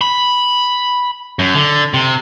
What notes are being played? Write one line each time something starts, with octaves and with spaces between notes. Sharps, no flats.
B5
F#2
D3
C3